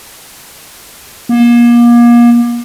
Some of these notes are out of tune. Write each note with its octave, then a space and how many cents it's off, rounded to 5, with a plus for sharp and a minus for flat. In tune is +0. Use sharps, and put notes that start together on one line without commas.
A#3 +35